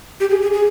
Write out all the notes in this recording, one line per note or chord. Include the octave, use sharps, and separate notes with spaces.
G4
G#4
G#4
G#4